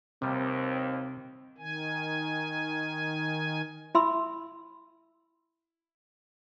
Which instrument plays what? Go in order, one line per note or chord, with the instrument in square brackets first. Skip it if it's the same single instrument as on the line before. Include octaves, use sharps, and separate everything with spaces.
[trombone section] D#2 [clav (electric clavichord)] C3 G3 [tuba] C4
[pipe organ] D#3 G#5
[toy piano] E4 E5 B5 C6 E6